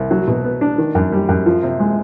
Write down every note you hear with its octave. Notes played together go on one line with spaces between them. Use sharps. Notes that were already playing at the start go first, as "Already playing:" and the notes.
Already playing: C2
F#3
B2
B3
D4
D#3
F#2
G3
F#2
F3
C3
G#3